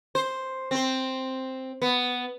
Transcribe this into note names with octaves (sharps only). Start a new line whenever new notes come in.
C5
C4 C5
B3